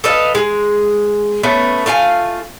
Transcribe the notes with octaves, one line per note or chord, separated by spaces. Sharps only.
A4 B4 D#5 F5
G#3 G#4
A3 B3 C#4
A3 F4 F5 G#5